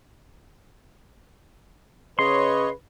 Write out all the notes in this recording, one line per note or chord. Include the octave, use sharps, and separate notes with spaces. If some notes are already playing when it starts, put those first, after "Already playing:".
C#3 B4 C#5 D#5 C6